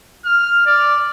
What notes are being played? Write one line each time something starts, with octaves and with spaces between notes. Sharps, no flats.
F6
D5